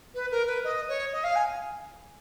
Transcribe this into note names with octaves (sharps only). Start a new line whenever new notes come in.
B4
A#4
B4
D#5
C#5
D#5
F5
G#5